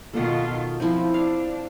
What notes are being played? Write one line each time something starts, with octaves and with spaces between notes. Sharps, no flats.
B2 D#3 F4 A4 F#5
F3 C4 E4
D4 F5